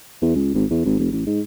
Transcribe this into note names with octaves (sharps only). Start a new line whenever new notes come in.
E2
C#2
G#1
E2
G#1
F1
A1
G#2